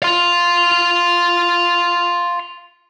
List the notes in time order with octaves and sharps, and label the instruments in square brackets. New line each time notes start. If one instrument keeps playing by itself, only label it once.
[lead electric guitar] F5 C6